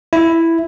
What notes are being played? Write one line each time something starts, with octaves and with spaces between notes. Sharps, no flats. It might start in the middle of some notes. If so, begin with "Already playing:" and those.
E4